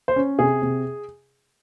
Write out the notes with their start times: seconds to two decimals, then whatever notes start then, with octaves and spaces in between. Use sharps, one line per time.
0.08 C5
0.16 C#4
0.39 C3 G#4
0.62 C3